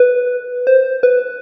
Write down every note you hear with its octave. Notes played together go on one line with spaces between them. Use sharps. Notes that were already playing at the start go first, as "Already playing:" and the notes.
Already playing: B4
C5
B4